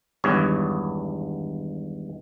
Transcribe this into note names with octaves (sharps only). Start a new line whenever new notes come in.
G#1 E2 G2 C#5